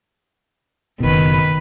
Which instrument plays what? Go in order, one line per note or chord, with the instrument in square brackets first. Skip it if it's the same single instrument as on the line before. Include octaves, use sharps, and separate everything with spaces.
[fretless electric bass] F#1 B2 [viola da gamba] D#3 B4